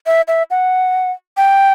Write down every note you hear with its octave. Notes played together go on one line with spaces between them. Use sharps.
E5
E5
F#5
G5